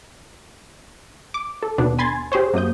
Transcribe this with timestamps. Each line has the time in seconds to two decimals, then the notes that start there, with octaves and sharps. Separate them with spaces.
1.34 D6
1.63 A4
1.78 D#2 B2 B3 D4
1.99 G#5 B5 C6 G#6 A6
2.32 G4 G#4 C5 C#5
2.54 F#2 A#3 D#6 G6